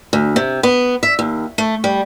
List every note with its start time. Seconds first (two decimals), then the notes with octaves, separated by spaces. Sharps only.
0.13 D2
0.36 C3
0.63 B3
1.03 E5
1.19 D#2
1.58 A3
1.84 G3